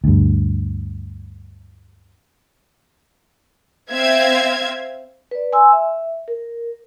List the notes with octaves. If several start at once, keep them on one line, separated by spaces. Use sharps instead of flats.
D2 G2
C4 E5 F5 G#6
B4 D5
G#5 C6 E6
E5
A#4